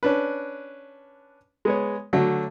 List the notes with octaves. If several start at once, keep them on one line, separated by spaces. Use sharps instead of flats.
C#4 D4 B4
G#3 B3 C#5
D3 F#3 A3